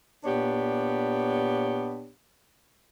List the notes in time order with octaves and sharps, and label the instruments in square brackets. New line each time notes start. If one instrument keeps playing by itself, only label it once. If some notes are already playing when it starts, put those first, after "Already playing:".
[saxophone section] A#2 B3 D4 G4 C#5